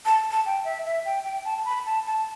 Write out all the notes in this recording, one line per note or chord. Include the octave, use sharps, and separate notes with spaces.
A5
A5
G5
E5
E5
G5
G5
A5
A5
B5
A5
A5